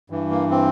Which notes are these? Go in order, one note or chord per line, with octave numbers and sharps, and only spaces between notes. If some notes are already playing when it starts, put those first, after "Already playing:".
G2 E3
A#3
C4